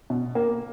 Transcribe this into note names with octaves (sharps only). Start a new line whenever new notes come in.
B2
A#3